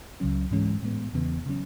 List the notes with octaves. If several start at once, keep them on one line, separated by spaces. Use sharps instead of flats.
C#2 C#3 F#3 C#4
G#2 E3 G#3 C#4
A2 G#3 B3
E2 C#3 E3 B3
C#3 F#3 C#4